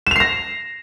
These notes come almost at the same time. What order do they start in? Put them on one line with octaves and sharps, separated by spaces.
E7 F7 C7 A#6